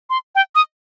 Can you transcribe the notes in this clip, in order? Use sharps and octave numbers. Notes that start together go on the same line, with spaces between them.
C6
G5
D#6